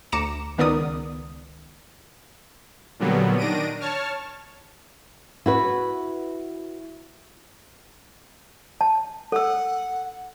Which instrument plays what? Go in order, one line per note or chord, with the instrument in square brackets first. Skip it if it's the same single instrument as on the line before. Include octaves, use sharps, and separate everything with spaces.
[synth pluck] D2 A#5 D6 C#7 E7
C#2 D#3 B3 A#4 D5 D#6
[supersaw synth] A#2 D3 F#3 G3 B3
D#3 D4 A#6 D7 D#7
C#5 A5 C#6 F6
[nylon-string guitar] E4 F#4 B4
[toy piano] A5
[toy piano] A4 E6 [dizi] F#5